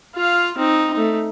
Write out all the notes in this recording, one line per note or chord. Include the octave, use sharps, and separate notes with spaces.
F4 F5
C4 D#4
A3 D#4